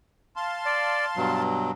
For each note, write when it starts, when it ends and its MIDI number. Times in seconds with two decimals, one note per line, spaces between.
0.36 1.43 77
0.36 1.43 81
0.36 1.43 84
0.66 1.05 74
1.17 1.71 43
1.17 1.71 47
1.17 1.71 54